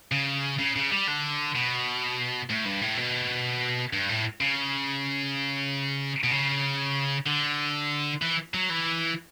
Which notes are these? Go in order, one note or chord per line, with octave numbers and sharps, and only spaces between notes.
C#3
C#3
C#3
G3
D3
B2
A2
G2
A2
B2
G2
A2
C#3
B2
C#3
D3
E3
F#3
E3